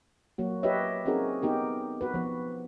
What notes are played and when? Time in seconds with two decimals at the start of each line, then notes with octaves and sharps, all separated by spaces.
0.38 F#3 A#3 F#4
0.63 F4 G4 B4 C#5 D#5 E5
1.05 C4 C#4 D#4 F#4 G#4 A#4
1.42 B3 D#4 G4 A#4
2.01 F#4 B4
2.14 F3 B3